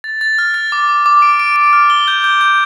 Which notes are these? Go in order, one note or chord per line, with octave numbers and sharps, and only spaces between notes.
A6
A6
F6
A6
D6
D6
D6
D7
D7
D7
F6
G7
G6
G6
G6